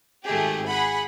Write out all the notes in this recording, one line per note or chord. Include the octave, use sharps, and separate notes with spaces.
G#1 A3 G4 G#4
G#4 F#5 B5